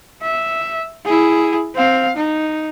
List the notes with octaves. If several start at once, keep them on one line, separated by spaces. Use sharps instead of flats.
E5
E4 G#4
C4 F5
D#4